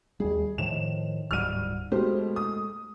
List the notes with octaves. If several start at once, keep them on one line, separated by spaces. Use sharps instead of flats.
D#2 G3 G#4
A2 D#3 F3 E7
D1 G#2 G3 F6 D#7
B2 G#3 A3 G4 C5
D#6